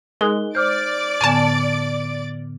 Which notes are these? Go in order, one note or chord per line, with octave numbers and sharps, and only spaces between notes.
G#3 D#4 G#4 A#4 D#6 F#6 G7
C5 D5 D6 F6 G6 A6 D7
A2 D3 B3 G#5 A5